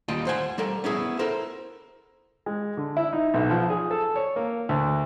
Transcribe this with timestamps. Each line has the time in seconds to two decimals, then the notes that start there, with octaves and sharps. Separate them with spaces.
0.08 D#2 G3 F4 D#5 G5 C6
0.27 C5 F#5 G#5 C6
0.58 G3 A4 A#4
0.84 B3 C#4 E4 G#4
1.19 A4 A#4 C5
2.46 G#3
2.77 D3
2.97 E4
3.13 D#4
3.34 B1
3.50 F3
3.70 G#4
3.91 A4
4.16 C#5
4.36 A#3
4.69 D2